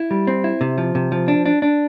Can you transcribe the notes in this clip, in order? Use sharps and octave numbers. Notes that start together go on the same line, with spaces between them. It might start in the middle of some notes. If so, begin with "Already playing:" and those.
Already playing: E4
G3
C4
E4
C3
F3
C3
F3
D4
D4
D4